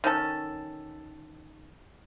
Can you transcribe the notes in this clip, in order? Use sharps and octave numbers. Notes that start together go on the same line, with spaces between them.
D#3 C#4 A4